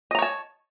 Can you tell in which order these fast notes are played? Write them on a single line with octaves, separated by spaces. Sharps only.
D#5 A#5 C#5 A5